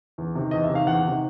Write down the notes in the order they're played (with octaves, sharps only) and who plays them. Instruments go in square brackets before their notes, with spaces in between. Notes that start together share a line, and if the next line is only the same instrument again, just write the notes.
[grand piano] E2
C3 D#3
E2 D#5
E5
C3
D#3 F5
E2 F#5
C3 D#3